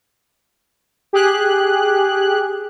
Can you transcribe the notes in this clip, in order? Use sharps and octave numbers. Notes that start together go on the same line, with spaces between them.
G4 G#4 F#6